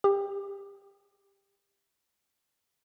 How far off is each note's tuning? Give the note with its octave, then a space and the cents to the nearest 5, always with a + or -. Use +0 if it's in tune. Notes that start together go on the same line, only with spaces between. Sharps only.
G4 +25